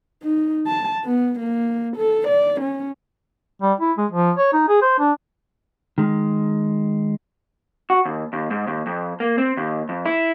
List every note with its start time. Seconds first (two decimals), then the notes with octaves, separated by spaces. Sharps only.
0.23 D#4
0.67 A5
1.05 B3
1.39 A#3
1.97 A4
2.28 D5
2.61 C#4
3.62 G3
3.81 E4
3.98 G#3
4.12 F3
4.37 C#5
4.53 D#4
4.69 G#4
4.82 C5
4.99 D4
5.98 D#3 G#3
7.90 F#4
8.05 D#2
8.33 D#2
8.50 G#2
8.67 D#2
8.86 F2
9.20 A#3
9.38 C4
9.57 D#2
9.89 F2
10.06 E4